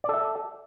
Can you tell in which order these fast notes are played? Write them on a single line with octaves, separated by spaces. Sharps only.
D5 A4 E5